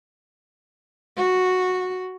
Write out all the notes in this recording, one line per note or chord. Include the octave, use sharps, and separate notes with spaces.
F#4